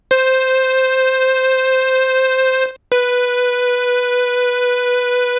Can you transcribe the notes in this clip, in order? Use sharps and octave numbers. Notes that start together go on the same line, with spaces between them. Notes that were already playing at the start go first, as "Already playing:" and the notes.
C5
B4